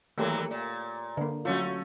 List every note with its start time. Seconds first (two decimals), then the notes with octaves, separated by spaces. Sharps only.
0.18 D#2 E3 F#3 A3 A#3 G4
0.51 A#2
1.17 D3 A#3
1.45 F#3 A3 C#4 F4